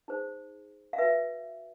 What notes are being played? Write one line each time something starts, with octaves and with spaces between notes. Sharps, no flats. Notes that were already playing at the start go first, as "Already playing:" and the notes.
D#4 G#4 C5
F5
F#4 B4 E5